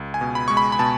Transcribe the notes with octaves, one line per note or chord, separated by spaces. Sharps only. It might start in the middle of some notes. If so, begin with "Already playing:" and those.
Already playing: C#2
G#5
B2
B5
G#3 C#6
B5
B5
B2 A5